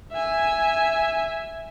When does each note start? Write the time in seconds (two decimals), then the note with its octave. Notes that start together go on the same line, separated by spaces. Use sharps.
0.12 E5 G#5